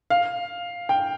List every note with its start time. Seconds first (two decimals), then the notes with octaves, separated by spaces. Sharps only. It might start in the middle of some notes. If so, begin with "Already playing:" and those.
0.10 F5
0.89 G5